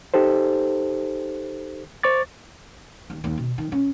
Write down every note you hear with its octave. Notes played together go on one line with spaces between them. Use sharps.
D#4 G4 A4 C5
C5 C#6 D6 A6
D#2
D#2
B2
D#3
C#4